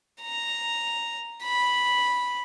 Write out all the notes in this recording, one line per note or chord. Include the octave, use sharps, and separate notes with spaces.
A#5
B5